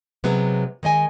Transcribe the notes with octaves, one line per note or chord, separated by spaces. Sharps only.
C3 F#3 G#3 B3
D#3 G#3 D#5 G#5